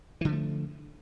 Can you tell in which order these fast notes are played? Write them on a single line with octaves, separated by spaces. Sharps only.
E3 D3 F3 A3